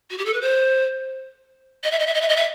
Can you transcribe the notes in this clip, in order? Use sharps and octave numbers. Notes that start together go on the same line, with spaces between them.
F#4
G4
A4
B4
C5
D#5
E5
D#5
E5
D#5
E5
D#5
E5